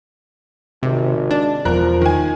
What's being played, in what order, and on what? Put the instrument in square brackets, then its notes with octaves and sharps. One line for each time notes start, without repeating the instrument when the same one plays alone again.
[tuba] G#1 [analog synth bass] C3
[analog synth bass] D4
[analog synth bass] E1 [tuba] F3 [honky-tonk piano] A#4 F#6
[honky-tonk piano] D#3 G#5